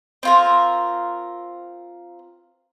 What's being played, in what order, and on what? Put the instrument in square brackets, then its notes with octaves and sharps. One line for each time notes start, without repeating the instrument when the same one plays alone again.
[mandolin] C4 F4 A#4